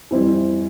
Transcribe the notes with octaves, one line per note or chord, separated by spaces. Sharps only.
F2 E3 G3 C4 E4